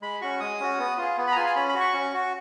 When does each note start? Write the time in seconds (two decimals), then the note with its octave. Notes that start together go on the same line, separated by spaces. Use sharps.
0.02 G#3 B5
0.21 C#4 F#4 C#6
0.40 G#3 D#6
0.60 C#4 F#4
0.79 B3
0.97 F4 G#4
1.18 B3
1.27 B5
1.32 A#5
1.36 F4 G#4 G#5
1.46 G#5
1.55 C#4 B5
1.69 B5
1.74 F#4
1.80 C#6
1.93 C#4
2.14 F#4